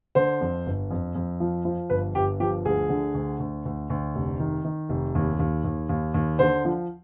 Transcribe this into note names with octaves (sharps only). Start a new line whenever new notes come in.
D3 C5
F2
G1
F2
F2
F3
F3
G1 B4
G1 G4
F3 G4
D2 G#4
D3
D2
D2
D2
D2
F1
D#3
D#3
F1
D#2
D#2
D#2
D#2
D#2
D3 C5
F3